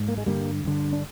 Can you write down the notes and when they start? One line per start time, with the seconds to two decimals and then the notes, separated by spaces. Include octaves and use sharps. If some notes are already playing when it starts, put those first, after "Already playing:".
Already playing: G#2
0.08 A#3
0.18 G#3
0.26 G2 D3 G3 A#3
0.64 G2 D3
0.93 D4